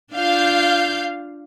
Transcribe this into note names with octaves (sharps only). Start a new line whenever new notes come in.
D4 F4 F5 G6